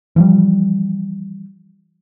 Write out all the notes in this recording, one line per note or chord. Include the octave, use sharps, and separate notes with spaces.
E3 F3 G3